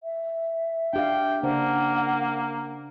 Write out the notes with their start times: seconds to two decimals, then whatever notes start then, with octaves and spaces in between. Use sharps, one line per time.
0.03 E5
0.93 D4 G4 F5 G5
1.43 C#3 A#3 D4 C5 F#5